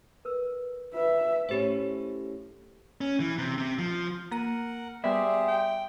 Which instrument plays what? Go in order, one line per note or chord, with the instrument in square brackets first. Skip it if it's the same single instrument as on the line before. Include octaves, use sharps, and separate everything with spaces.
[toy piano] A#4 B4 E6
[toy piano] F4 B4 [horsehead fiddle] E5
[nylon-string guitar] A2 C#4 [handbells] G4 C5
[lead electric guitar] C#4
E3
C3
C3
F3
[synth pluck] A#3 A#5 D#7 [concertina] A#4 F#5
[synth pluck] G3 B3 [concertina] G4 G#4 C5 [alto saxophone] D5 [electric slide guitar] E5
[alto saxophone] G5